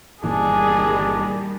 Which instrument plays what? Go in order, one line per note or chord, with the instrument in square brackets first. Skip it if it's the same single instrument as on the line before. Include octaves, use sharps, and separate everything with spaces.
[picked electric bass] G1 A#2 E3 [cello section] D#3 G3 [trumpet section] D4 [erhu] G#4